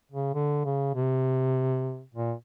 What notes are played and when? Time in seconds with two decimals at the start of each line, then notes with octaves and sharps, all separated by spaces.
0.12 C#3
0.34 D3
0.65 C#3
0.95 C3
2.15 A#2